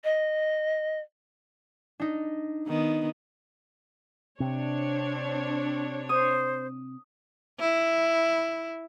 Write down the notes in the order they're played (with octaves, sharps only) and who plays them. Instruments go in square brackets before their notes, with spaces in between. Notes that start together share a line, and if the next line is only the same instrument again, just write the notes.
[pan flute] D#5
[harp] D4 D#4
[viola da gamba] D#3 B3
[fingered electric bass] C3 [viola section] C4 D4 C#5
[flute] C5 [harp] D#6
[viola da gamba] E4